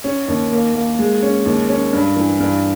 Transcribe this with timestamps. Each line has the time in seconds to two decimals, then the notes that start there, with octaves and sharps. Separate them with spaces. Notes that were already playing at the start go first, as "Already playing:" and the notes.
0.04 C#4
0.28 D#2
0.52 A#3
0.75 A#3
0.99 G#3
1.22 C#4
1.46 D#2
1.69 C#4
1.93 G2
2.17 E3
2.40 G2